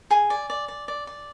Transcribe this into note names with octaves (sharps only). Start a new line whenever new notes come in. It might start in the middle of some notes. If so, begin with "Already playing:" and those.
G#4 G#5
D5
D5
D5
D5
D5